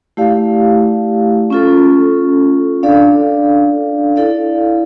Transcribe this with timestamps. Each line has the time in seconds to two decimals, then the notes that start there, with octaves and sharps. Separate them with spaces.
0.17 A3 E4 G4 D5 F5
1.50 C#4 F4 A4
2.83 D4 A4 D5 F5
4.16 E4 A4 D5 F5